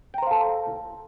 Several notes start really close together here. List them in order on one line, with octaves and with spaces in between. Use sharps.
G5 A#5 C5 F5 A4